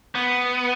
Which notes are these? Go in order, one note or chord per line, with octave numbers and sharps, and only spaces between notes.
B3